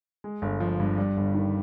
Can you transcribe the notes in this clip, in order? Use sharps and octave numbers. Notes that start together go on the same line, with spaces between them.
G#3
G1
F3
G2
G3
G1
D#3